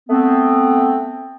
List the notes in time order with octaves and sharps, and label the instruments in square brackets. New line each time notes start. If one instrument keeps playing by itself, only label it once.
[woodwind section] A3 B3 C4